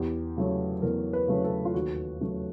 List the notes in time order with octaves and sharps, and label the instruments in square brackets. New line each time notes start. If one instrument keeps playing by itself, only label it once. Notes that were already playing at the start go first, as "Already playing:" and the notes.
Already playing: [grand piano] E2 G4
C#3 F#3 A3
E2 A#4
B4
C#3 F#3 A3
A4
F4
D#2 F#4
C#3 F#3 A3